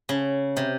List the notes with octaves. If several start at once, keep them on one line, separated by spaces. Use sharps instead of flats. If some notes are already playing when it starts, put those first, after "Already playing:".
C#3
C3